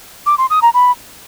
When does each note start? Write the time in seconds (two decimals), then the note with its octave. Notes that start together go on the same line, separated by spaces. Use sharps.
0.26 D6
0.38 C6
0.50 D#6
0.62 A#5
0.74 B5